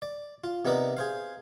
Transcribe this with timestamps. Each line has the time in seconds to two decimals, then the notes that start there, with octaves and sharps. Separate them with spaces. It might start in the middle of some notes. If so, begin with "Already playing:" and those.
0.02 D5
0.44 F4
0.65 C3 B3 D#4 A#4 B4 D5
0.97 G#4 C5 F5